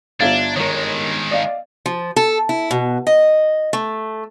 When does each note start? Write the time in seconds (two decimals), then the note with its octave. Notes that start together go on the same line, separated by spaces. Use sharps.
0.20 G1 D4 F4 E5 F5 G#6 A6
0.56 D#3 G#3 A#4 C#5
1.31 D5 D#5 F5
1.86 F3
2.16 A4
2.49 E4
2.71 B2
3.07 D#5
3.73 A3